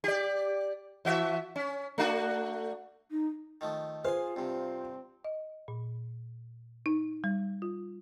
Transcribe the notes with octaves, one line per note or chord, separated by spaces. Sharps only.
G4 D5
E3 F#4 E5
C#4
A3 D4 F#4
D#4
D#3 F3 A3
F4 G#4 C5 F5 G#5
G2 C3 C4
D#5
A#2
D#4
G3
F4